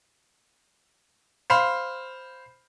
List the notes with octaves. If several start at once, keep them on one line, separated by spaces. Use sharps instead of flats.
C5 F5 B5